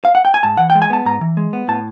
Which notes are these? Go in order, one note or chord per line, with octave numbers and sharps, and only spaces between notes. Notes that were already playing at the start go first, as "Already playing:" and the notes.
F5
F#5
G5
G#5
G#2 A5
E3 F#5
G5
G#3
G#5
B3 A5
G#2 A#5
E3
G#3
B3
A2 A5